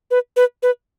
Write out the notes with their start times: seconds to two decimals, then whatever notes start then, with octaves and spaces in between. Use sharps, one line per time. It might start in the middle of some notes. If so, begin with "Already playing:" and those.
0.11 B4
0.36 B4
0.63 B4